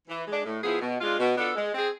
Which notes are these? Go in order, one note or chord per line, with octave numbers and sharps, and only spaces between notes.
E3
G#3 D4
A2
F3 B3 E4 G#4
B2
G#3 D4 F4
B2
B3 D4 F4 A4
G#3
C4 G#4